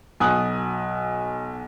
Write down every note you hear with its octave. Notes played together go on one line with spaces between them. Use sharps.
B1 G#5 D#6 F#6